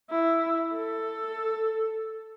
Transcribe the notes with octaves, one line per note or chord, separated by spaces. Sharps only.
E4
A4